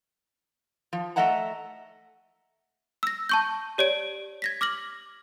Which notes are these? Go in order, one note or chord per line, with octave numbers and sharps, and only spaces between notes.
F3
A3 A4 D#5 E5 F#5 A#5
E6 A#6
A5 C#6 G6
G4 C#5 D5 D7
G#6 A#6 B6
D6 F6 A#6 F#7